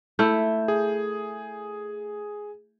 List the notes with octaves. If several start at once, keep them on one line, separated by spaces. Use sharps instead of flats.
A3 E4 G6
G#4